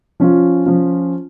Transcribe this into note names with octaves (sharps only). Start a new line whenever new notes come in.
F3 C#4 F4
F3 C#4 F4